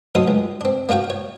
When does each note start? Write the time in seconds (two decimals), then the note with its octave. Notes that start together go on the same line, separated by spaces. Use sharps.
0.15 D2 F#3 D#4 A4 C6 D#6
0.28 C#2
0.61 C4 D4
0.89 A#3 D4 F4 F#4 G5
1.10 C#5